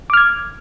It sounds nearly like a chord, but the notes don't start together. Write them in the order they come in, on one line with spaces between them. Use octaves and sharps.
D6 F6 G#6